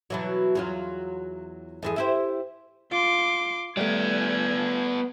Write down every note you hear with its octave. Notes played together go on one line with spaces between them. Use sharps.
B2 E3 F#3
E2 F#3 F4
F2 E3 G#4
E4 G4 C5
F4 C6 D6
G3 A3 B3 D5 G#6